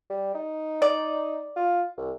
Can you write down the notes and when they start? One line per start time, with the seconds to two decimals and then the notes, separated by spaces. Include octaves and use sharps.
0.10 G3
0.35 D#4
0.82 D5
1.56 F4
1.98 C2